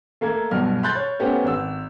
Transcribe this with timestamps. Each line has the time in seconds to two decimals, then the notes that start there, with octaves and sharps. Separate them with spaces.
0.21 A3 A#3 A4 G#6
0.51 B1 G2 B2 F6
0.83 B5 C6 F#6 G6 A6
0.95 C#5
1.19 A3 B3 C#4 G4 C5 F#5
1.44 G#1 E6